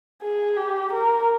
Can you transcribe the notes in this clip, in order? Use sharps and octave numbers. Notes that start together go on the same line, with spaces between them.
G#4
G4
A#4